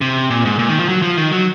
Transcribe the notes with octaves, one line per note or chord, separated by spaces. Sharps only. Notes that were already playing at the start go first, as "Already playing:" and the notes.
C3
A#2
G#2
A#2
D#3
F3
F#3
F3
D#3
F#3